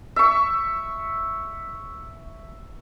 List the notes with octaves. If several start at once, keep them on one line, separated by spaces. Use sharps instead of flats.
E5 C#6